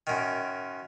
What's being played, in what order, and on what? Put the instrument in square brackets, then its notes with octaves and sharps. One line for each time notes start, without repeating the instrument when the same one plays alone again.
[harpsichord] F#2 D#3